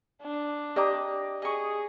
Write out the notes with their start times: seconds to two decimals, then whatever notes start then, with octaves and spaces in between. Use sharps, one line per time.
0.22 D4
0.76 G4 D5 D#5 G5 A#5 D6
1.42 G#4 D#5 C#6